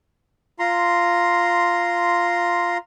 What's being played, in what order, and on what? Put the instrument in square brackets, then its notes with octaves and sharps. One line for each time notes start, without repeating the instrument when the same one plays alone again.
[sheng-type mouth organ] F4 A#5 C6